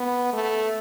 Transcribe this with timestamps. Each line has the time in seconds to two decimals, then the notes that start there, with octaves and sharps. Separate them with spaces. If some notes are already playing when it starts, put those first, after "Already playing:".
Already playing: B3
0.33 A3